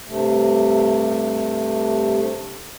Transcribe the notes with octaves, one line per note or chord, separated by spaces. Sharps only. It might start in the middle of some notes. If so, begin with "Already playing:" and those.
G2 C3 A3